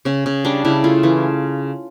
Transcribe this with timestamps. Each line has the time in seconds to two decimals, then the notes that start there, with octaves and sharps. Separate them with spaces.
0.05 C#3 C#4
0.26 C#3
0.45 G3 D4
0.65 C#3 E4
0.84 A3 F4
1.03 E3